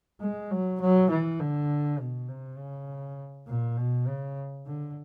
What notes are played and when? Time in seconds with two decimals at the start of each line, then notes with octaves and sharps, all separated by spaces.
0.21 G#3
0.51 F#3
0.81 F#3
1.10 E3
1.40 D3
2.00 B2
2.29 C3
2.58 C#3
3.47 A#2
3.77 B2
4.07 C#3
4.66 D3